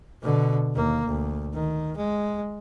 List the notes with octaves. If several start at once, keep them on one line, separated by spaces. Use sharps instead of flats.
B2 D3
D#2 A#3
D2
D#3
G#3